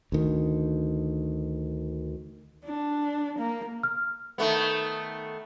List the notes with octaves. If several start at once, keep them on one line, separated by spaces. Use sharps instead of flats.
D2 D#3
D4
A#3
F6
D#3 A3 B3